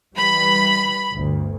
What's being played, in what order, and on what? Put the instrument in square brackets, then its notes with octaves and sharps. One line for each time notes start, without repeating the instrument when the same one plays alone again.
[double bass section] E3 G3 [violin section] B5
[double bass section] G1 D2